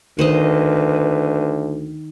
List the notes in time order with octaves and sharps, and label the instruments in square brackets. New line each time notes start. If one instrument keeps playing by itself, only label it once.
[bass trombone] D2 [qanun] D#3 C5 D#5 [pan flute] B4